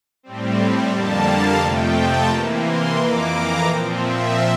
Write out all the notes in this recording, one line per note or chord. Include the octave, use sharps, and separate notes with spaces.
A2 G3 C4
F2 D3 G3 A#3 A5
F5
F2 C3 F3 A3 G5
A5
C3 E3 A#3 A#5
C6
F2 E3 A#3 D6
A#5
A#2 F3 C4 G5
E5